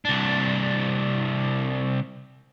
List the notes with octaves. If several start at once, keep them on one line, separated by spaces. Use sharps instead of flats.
C2 D4